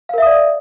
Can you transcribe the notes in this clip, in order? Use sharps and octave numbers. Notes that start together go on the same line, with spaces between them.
A#4 D5 E5 F5 D#6